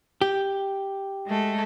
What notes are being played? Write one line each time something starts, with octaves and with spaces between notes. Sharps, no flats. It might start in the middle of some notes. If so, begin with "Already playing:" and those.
G4
G#3 A3